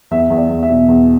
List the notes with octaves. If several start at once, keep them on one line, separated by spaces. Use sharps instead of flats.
E2 E5
E2
D5
E2
E5
B2
E2